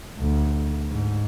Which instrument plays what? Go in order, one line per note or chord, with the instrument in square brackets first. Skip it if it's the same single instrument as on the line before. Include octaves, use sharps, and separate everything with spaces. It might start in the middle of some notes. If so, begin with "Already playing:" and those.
[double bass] D2
G#2